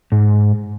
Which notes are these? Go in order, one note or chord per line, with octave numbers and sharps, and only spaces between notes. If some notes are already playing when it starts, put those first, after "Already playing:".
G#2